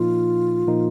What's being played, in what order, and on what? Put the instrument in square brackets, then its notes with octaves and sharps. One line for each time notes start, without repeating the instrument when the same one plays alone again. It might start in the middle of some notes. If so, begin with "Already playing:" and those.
Already playing: [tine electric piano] A#2 F3 A#3 D#4 [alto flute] F4
[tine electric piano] A#2 F3 A#3 D#4